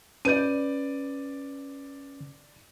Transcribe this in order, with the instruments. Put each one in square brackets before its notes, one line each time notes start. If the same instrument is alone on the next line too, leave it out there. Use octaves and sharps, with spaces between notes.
[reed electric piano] C#4 B4 G6 [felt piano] D5 D#7